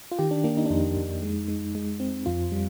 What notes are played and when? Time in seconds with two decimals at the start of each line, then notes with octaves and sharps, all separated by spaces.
0.11 F4
0.19 D#3 G4
0.31 D4
0.44 A#3 D4
0.57 D#4
0.66 D4
0.70 F2 D#4
0.97 F2
1.23 G#3
1.48 G#3
1.75 G#3
2.00 C4
2.26 F2 F4
2.52 G3